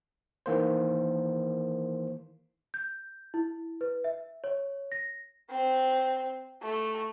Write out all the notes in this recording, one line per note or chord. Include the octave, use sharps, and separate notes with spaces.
D#3 E3 A#3 C5
G6
E4
B4
E5
C#5
A#6
C4
A3